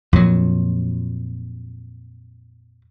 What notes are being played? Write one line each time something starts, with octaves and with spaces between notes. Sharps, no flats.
F2 A#2 F#3